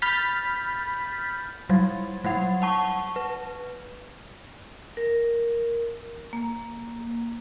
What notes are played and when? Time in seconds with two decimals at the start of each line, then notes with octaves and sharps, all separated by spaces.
0.02 B5 F6 G6 A6 B6
1.69 F#3 G3
2.24 F#3 G3 F#5
2.62 F#5 A5 C#6
3.16 B4
4.97 A#4
6.33 A#3